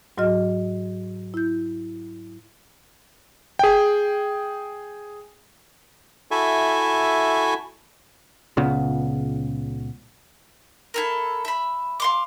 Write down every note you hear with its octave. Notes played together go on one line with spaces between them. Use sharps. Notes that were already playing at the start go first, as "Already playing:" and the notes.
G#2 F#3 F#4 D#5 F6
E4 G6
G#4 G5
E4 F#4 A4 E5 G#5
C#2 A#2 C#3 B3
E4 A4 A#4
E5 B5
F5 C6 D6